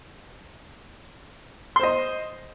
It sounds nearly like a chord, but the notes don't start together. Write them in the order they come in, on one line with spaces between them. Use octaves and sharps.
C6 C5 D#5